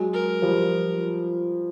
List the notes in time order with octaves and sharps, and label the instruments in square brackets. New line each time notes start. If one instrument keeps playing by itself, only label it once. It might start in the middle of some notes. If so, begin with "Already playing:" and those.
Already playing: [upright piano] F#3 G#3
[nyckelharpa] A#4
[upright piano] F3 G3